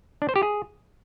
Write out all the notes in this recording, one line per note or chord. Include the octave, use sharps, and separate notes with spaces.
D4
C5
G4
G#4